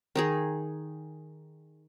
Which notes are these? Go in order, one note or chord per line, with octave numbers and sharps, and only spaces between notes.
D#3 D#4 G#4